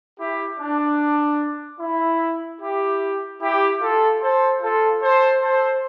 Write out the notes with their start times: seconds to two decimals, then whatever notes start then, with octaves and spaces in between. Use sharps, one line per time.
0.19 E4 G4
0.60 D4
1.80 E4
2.61 E4 G4
3.41 E4 G4
3.81 F4 A4
4.21 A4 C5
4.61 F4 A4
5.02 A4 C5
5.42 A4 C5